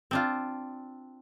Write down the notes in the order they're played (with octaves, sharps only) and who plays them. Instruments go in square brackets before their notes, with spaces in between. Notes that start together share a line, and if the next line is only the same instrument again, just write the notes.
[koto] C4 D4 F4